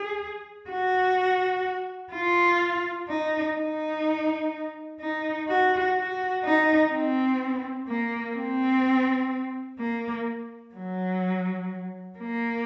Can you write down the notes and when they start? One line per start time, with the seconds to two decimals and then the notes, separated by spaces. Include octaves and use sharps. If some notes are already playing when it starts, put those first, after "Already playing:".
Already playing: G#4
0.69 F#4
2.13 F4
3.09 D#4
3.56 D#4
5.01 D#4
5.48 F#4
5.96 F#4
6.44 D#4
6.92 C4
7.88 A#3
8.36 C4
9.79 A#3
10.75 F#3
12.19 A#3